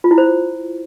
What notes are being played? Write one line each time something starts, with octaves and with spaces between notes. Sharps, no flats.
F4
E4
C5